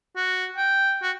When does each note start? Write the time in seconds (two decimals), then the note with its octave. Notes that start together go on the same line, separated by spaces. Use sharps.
0.16 F#4
0.56 G5
1.02 F#4